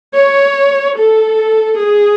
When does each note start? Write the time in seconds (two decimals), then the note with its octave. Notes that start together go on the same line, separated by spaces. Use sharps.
0.15 C#5
0.98 A4
1.80 G#4